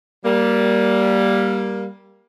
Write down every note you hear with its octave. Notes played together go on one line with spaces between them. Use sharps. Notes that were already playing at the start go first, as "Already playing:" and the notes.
G3 A#3